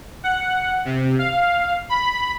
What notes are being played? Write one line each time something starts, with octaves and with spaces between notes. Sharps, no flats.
F#5
C3
F5
B5